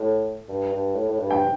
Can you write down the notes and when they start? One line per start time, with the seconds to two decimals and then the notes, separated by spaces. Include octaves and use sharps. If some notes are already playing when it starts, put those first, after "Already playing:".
Already playing: A2
0.49 G2
0.72 G2
0.95 A2
1.08 A2
1.19 G2
1.30 G5